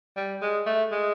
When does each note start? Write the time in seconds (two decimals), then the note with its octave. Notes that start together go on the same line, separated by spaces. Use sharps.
0.16 G3
0.42 G#3
0.66 A3
0.91 G#3